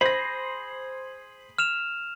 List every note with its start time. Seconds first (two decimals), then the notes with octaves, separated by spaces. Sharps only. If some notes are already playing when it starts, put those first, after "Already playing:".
0.01 G#4 C5 B5 A#6
1.58 F6 E7 F7